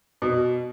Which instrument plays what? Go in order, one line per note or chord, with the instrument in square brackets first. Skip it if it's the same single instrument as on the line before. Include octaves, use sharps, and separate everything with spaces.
[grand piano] B2